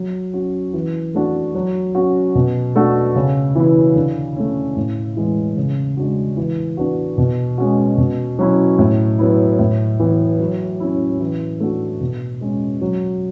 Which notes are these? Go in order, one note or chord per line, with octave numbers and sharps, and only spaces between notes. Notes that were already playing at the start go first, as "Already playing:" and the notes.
Already playing: F#3
C#4 F#4
E3
A3 D4 F#4
F#3
C#4 F#4
B2
A3 D4 F#4
C#3
E3 B3 E4
D3
A3 C#4
A2
E3 G#3
C#3
G#3 D4 F#4
E3
B3 D4 F#4
B2
G#3 C#4 F#4
B2
F#3 C#4 E4
A2
F#3 B3 E4
A2
E3 B3
F#3
C#4 E4
E3
A3 D4 F#4
B2
G#3 C#4
F#3